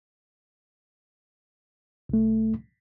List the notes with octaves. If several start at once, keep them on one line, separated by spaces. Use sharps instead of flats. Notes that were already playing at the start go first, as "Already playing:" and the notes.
C2 A3